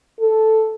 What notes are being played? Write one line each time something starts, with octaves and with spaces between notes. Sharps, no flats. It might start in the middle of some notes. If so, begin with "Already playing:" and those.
A4